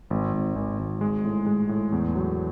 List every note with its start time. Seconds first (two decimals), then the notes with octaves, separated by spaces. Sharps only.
0.10 G#1
0.33 G#1
0.56 G#1
0.79 G#1
1.01 G#3
1.25 A2
1.46 G#3
1.69 A2
1.92 E2
2.15 F#3